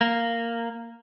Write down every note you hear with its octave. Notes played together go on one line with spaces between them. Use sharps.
A#3